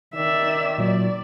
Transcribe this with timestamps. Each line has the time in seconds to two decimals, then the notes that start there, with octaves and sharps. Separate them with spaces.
0.15 D#3 D5 E5
0.78 A#2 F#3 D5